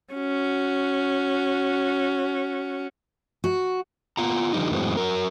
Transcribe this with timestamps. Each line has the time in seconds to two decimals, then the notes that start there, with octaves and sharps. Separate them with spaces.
0.14 C#4 F#4
3.44 F#4
4.17 B3 F4 A#5
4.53 D3 F3 G3 D#4
4.71 F#2 A2 E3 F#3 G#3 C4
4.97 F#3 A#4